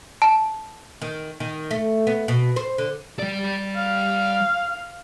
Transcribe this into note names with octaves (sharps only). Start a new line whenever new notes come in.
A5
D#3
D#3
A3
B3
B2
C5
D3
G3 D5
F5